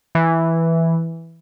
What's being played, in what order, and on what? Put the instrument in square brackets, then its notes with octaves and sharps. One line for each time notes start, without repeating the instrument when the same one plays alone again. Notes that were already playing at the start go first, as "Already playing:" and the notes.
[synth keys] E3